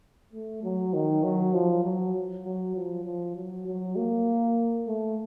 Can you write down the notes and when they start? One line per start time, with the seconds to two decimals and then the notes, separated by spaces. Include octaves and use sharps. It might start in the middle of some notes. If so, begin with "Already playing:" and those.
0.33 A3
0.63 F#3
0.94 D#3
1.24 F#3
1.54 F3
1.84 F#3
2.45 F#3
2.76 F3
3.06 F3
3.36 F#3
3.67 F#3
3.96 A#3
4.87 A3